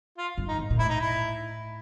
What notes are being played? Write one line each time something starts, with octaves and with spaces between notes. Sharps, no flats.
F4
G2
D#4
G#2
A#2
A2 E4
D#4
E4